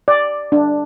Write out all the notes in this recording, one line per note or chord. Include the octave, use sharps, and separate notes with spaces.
D5
D4